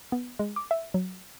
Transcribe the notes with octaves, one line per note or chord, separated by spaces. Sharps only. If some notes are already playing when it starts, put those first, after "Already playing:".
B3
G#3
D6
E5
F#3